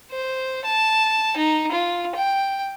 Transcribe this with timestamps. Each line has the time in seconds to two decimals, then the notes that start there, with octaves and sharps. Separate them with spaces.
0.11 C5
0.65 A5
1.37 D#4
1.72 F4
2.15 G5